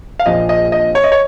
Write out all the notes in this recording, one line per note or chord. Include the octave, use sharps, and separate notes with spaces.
F5
A#1 A#2 F3 D#5
D#5
D#5
C#5
D#5
C#5